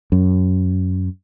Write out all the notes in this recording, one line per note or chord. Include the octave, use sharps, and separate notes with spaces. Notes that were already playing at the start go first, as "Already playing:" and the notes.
F#2